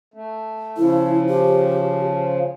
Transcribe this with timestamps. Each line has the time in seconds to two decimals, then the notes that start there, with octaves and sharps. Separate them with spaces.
0.14 A3
0.77 C#3 F3 E4
1.28 G4